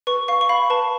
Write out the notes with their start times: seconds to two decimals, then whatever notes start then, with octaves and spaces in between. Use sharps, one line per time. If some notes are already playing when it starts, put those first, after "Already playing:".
0.07 B4 C#6
0.28 F5 C#6
0.41 C#6
0.49 F5 B5
0.70 B4 A5